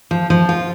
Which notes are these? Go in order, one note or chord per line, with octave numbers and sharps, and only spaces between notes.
F3
F3
F4